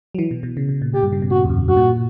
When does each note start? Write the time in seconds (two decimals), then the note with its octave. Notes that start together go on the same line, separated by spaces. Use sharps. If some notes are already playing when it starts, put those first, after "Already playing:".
0.15 F#3
0.19 E3
0.31 B2
0.43 B2
0.57 C#3
0.69 B2
0.82 A#2
0.94 A#2 G4
1.03 G2
1.12 C#3
1.22 B2
1.31 A#2 F#4
1.45 E2
1.49 F#2
1.68 G2 F#4
1.77 A#2